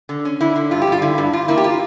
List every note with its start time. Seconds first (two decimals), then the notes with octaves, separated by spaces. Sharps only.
0.09 D3
0.25 C#4
0.40 D3 E4
0.56 D3
0.71 G2 F4
0.82 G4
0.87 G2 F4
1.02 D3 E4
1.18 G2
1.33 G2 F4
1.48 A#3 E4
1.57 G4
1.64 F4